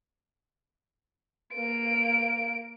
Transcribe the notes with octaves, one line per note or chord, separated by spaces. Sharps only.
A#3 D7